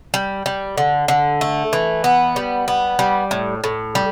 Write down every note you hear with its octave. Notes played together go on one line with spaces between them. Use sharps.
G3
G3
D3
D3
A3
E3
B3
G3
B3
G3
A2
A2
G3